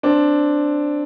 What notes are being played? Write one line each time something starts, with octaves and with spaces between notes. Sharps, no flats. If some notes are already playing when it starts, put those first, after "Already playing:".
C4 D4